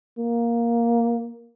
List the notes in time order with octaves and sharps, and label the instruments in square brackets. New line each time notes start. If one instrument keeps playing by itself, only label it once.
[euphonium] A#3